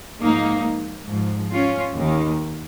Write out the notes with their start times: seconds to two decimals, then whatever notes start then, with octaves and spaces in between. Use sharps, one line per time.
0.21 G#2 F3 A#3 D#4
1.08 G#2 F3
1.53 C#4 F4
1.98 D#2 D#3